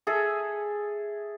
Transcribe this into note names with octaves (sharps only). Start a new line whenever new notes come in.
G#4 A4 E5